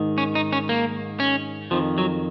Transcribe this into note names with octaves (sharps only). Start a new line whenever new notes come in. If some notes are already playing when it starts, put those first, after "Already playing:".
Already playing: G#2 D#3
C#4
D#4
C#4
A#3
C#4
F2 D#3 F3
F#3